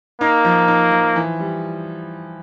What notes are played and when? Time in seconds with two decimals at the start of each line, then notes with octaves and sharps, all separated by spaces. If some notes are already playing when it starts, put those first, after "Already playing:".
0.21 A#3 D#4
0.45 F3
0.68 D#4
0.92 F3
1.16 E3
1.40 G3